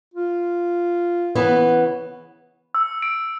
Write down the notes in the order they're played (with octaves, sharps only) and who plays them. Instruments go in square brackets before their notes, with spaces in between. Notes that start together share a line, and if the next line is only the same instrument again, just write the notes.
[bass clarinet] F4
[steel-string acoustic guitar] C#3 E3 B3
[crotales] E6
D7